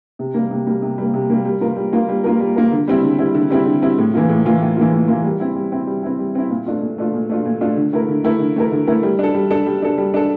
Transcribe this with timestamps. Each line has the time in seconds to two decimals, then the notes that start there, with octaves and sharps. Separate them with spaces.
0.19 C3
0.34 G3 A#3
0.51 C3
0.67 G3 A#3
0.82 C3
0.98 G3 A#3
1.14 C3
1.30 G3 A#3
1.45 G3
1.61 A#3 F4 A#4
1.76 G3
1.93 A#3 F4 A#4
2.09 G3
2.24 A#3 F4 A#4
2.40 G3
2.56 A#3 F4 A#4
2.72 D3
2.88 G3 C4 E4
3.03 D3
3.19 G3 C4 E4
3.35 D3
3.50 G3 C4 E4
3.66 D3
3.82 G3 C4 E4
3.98 A2
4.14 E3 A#3 F4
4.29 A2
4.45 E3 A#3 F4
4.61 A2
4.77 E3 A#3 F4
4.93 A2
5.08 E3 A#3 F4
5.24 G3
5.40 C4 E4
5.56 G3
5.72 C4 E4
5.87 G3
6.03 C4 E4
6.19 G3
6.35 C4 E4
6.51 A#2
6.66 A3 D4 F4
6.82 A#2
6.98 A3 D4 F4
7.14 A#2
7.29 A3 D4 F4
7.45 A#2
7.61 A3 D4 F4
7.77 D3
7.93 A3 E4 A#4
8.09 D3
8.24 A3 E4 A#4
8.40 D3
8.56 A3 E4 A#4
8.72 D3
8.87 A3 E4 A#4
9.03 G3
9.19 D4 A4
9.34 G3
9.51 D4 A4
9.66 G3
9.82 D4 A4
9.98 G3
10.14 D4 A4